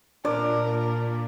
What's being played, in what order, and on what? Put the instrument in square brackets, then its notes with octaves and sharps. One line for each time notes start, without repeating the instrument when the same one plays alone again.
[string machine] A#2 [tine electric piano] D4 [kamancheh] A#4 [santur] D5